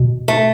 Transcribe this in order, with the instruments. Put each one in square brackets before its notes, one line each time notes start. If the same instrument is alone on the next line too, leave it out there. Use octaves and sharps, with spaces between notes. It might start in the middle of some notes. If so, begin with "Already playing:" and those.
Already playing: [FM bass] B2
[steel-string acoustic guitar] A3